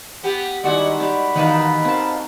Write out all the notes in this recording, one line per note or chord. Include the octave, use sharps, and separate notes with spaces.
B3 G4
D#3 G3 G#3 E4 F#4 D5
G4 D5 E5 B5
B2 D#3 E3 A#3 D#4 B4 A5
C4 A#4 C5 A5